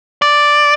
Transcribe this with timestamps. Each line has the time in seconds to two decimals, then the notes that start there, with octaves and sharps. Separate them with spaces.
0.22 D5